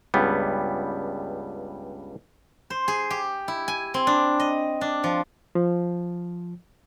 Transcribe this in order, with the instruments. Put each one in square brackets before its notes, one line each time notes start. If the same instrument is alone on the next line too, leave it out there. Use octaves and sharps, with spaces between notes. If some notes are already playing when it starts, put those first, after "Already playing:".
[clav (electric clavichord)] C#2 G2 G3 B3
[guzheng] C5
G#4
G4
E4
G#5
C4
D4
D#5
D4
F3
[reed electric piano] F3